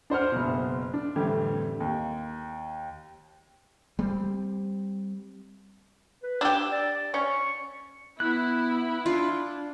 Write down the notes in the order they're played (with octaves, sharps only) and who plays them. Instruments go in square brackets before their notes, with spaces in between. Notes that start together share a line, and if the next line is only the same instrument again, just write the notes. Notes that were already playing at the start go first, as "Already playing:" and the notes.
[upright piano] D4 C5 F#5 F6
F#1 B2
D4
F2 A2 D3 E3 G3
D#2
[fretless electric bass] G3 C4
[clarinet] B4
[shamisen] D4 G4 [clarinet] E6
[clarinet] D5
[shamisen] C#4 [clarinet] C#6
[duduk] B3 [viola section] E4 [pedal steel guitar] F#6
[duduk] D4 [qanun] F4